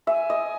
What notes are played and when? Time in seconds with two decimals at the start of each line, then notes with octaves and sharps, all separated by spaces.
0.07 E5 G#5
0.30 D#5